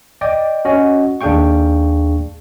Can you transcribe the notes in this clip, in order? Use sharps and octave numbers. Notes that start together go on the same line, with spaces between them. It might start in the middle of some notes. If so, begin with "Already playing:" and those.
D5 D#5 G5 D6
C#4 F#4 D#5
D#2 D4 G#4 F5 G5 C#6